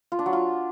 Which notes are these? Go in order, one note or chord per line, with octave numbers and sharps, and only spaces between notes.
F4
D4
F#3
F4